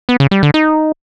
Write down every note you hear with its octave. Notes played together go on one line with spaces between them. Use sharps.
B3
C#3
G3
D3
D#4